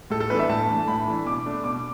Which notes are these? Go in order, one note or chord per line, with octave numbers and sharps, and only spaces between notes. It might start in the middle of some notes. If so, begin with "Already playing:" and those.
A2 A4
A4
E3 B3 D4 B4
E5
A2 A5
E3 A3 D4
A2 B5
E3 A3 D4
B2 D6
A3 D4
B2 D6